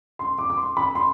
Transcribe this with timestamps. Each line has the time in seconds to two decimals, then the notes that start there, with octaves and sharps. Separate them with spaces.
0.19 C6
0.39 D6
0.50 D6
0.57 C6
0.77 B5
0.95 C6